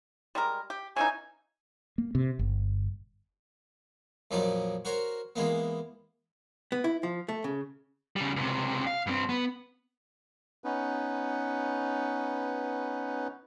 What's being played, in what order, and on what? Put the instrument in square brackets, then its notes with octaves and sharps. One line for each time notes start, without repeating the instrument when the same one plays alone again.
[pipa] G3 G#3 A#4
G4
[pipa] C#3 E3 D#4 [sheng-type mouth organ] G#5
[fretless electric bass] A#3
C3
G1
[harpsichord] F2 A#2 F#3 G3 D#4 D5
F#4 A#4 C5 C#5
E3 G#3 A#3 B3
[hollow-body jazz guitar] B3
E4
F3
A3
C#3
[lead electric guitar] C#3 G3
C#2 C3
F5
G2 C4
B3
[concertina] B3 C#4 D#4 B4